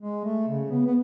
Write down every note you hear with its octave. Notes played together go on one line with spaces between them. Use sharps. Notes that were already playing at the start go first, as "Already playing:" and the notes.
G#3
A3
C#3
B3
B3